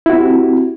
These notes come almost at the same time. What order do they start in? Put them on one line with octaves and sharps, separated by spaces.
E4 F#4 C4 G4